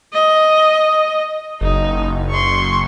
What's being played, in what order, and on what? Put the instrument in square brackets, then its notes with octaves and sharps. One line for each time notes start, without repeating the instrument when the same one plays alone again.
[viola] D#5
[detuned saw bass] F#1 [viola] D#4
[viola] C6 C#6